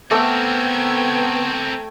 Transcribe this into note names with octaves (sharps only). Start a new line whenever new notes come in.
A3 B3 C4 A#4 G5 E6 G#6